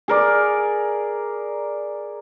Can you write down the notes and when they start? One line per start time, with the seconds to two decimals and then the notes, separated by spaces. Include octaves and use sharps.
0.08 G#4 A#4 D5